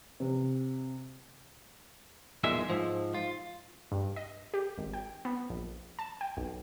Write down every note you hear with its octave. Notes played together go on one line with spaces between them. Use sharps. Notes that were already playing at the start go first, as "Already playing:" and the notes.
C3
B1 E2 A#2 G#3 E5
G#2 F3
F4
G2
D#5
G4
G#1
G5
B3
A#1
A5
G5
B1